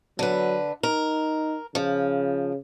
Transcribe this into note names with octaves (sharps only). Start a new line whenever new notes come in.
D3 F#3 B4
D#4 A#4
C#3 F3